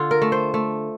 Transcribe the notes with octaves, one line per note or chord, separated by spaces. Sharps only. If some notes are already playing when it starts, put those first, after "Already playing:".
Already playing: D3 F4
A#4
A3
C5
A3